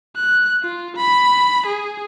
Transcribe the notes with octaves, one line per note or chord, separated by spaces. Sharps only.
F#6
F4
B5
G#4